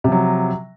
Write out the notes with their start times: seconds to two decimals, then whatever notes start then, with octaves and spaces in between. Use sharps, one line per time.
0.04 C3
0.08 F3
0.12 F#3